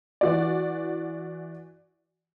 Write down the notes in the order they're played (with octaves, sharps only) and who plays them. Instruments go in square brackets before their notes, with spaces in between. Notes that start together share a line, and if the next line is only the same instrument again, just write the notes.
[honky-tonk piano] E3 F#4 D5